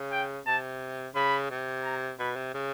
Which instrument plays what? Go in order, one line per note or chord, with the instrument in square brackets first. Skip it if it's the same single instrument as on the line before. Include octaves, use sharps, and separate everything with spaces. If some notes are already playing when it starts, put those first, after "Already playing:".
Already playing: [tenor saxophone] C#3
[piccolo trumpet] G5
[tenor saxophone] C3 [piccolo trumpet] A5
[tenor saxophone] C#3 [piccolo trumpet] B5
[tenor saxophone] C3
[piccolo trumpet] A#5
[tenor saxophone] B2 [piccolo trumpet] B5
[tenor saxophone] C3
C#3